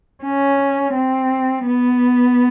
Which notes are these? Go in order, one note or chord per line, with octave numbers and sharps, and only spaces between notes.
C#4
C4
B3